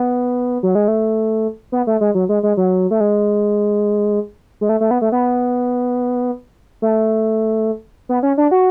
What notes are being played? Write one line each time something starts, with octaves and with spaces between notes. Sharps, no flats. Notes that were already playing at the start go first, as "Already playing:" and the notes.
Already playing: B3
F#3
G#3
A3
B3
A3
G#3
F#3
G#3
G#3
F#3
A3
G#3
G#3
A3
A3
B3
A3
B3
A3
B3
C#4
D4
F#4